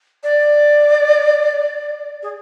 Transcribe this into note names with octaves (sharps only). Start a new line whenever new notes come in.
D5
G#4